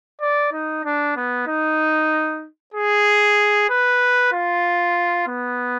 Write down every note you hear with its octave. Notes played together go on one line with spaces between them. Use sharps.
D5
D#4
D4
B3
D#4
G#4
B4
F4
B3